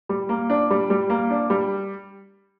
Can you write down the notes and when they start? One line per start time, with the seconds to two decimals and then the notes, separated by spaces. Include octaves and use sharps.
0.09 G3
0.29 A#3
0.50 D4
0.70 G3
0.90 G3
1.10 A#3
1.30 D4
1.50 G3